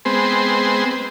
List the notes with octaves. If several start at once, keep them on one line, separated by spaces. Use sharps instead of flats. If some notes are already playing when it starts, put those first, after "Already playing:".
G#3 B3 C4 C5